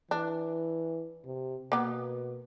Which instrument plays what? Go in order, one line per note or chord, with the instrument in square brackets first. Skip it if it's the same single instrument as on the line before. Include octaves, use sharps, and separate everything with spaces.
[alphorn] E3 [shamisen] D4
[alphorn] C3
[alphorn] B2 [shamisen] A#3 B3